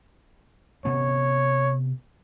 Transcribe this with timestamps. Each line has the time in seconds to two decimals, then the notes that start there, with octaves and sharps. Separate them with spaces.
0.85 C3 B3 C#4 C#5